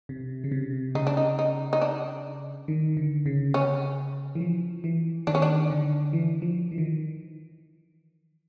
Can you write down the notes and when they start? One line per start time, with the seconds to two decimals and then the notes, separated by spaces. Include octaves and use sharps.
0.09 C3
0.44 C#3
0.52 C3
0.95 C#3 D#4
1.07 D4
1.17 D#4
1.39 D#4
1.73 D#4
1.81 D4
2.68 D#3
2.97 D3
3.26 C#3
3.54 C#4
4.35 E3
4.41 F3
4.84 E3
5.27 D#3 D4
5.35 C#4
5.42 D4
5.70 D3
6.13 E3
6.42 F3
6.72 E3
6.78 D#3